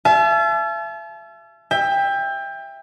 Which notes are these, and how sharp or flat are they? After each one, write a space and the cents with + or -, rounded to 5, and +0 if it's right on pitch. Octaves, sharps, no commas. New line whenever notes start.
E5 +40 A5 -40
E5 +0 G5 +25